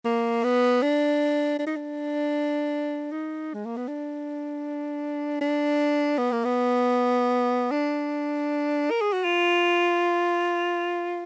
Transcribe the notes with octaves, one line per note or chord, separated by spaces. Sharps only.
A#3
B3
D4
D4
D#4
D4
D#4
G#3
A#3
B3
D4
D4
B3
A#3
B3
D4
A#4
G#4
F#4
F4